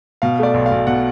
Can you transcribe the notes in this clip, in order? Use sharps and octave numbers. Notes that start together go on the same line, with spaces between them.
B2 F5
A3 D5
B1
F5
B1
B2 F#5